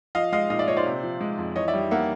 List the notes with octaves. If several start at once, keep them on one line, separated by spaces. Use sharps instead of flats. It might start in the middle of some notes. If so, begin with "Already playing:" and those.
F3 D#5 F5
G#3 D#5 F5
A#2 D#5 F5
D5 E5
A#2 C#5 D#5
C5 D5
C3
F3
G#3
F2
E3 C#5 D#5
D5 E5
G3
A#3 E5 F#5